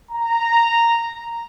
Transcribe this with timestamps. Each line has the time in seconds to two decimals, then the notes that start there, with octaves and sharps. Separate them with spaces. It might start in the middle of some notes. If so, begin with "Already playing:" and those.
0.11 A#5